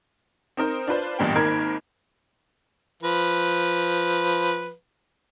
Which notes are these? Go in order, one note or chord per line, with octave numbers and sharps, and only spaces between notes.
C4 D#4 A#4 C5
D4 F4 B4 C5
A1 E2 G2 A#2 G5
G#1 D#3 A#3 A#4 B5 G#6
F3 B4